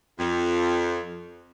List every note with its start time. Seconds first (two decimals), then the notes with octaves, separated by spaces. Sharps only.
0.19 F2